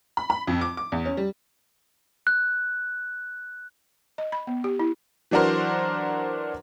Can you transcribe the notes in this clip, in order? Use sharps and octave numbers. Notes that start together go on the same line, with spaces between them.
B5
B5
F2
D6
D6
E2
C#4
G3
F#6
D#5
B5
B3
G4
E4
E3 F#3 D4 F#4 A#4 C5